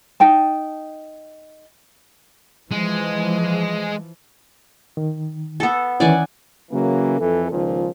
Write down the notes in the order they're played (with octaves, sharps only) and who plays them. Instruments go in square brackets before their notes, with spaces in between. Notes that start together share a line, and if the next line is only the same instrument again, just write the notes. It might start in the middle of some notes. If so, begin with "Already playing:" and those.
[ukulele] D#4 G5 A5
[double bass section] E3 F3 [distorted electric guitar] G#3
[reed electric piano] D#3
[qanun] B3 A4
[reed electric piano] D#3 E3 C#4 [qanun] D5 F#5 G#5
[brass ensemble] C#3 E3 F#3 A#3
F2 E3 A4
C#2 A#2 D#3 F3